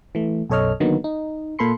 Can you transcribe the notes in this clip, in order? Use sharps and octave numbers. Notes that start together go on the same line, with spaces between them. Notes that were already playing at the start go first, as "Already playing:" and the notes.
E3 A3
B1 F#2 A4 C#5 D#5 F6
D3 D#3 F#3 A#3 B3 D#4
D#4
A#2 A#3 A4 B5 C6 C#7